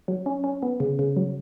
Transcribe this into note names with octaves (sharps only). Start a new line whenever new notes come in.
F#3
C#4
C#4
B3
C#3
C#3
F#3